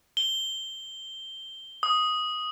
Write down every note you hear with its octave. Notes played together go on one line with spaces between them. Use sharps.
G7
D#6